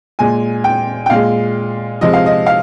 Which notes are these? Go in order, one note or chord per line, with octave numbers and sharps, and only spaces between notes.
A#2 G#3 G#5
G5
G5
A#2 G#3 F5
C3 F3 G#3 D#5
F5
D#5
F5